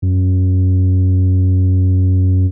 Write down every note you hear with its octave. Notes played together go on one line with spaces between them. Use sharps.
F#2